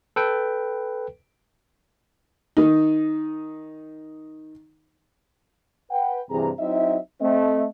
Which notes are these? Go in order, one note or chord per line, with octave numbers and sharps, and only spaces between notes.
A4 B4 G5
D#3 D#4
B4 F#5 G5
G2 C3 E3 C4 G#4 A#5
F#3 C4 D#4 E4 D#5 E5
A3 C4 D#5 E5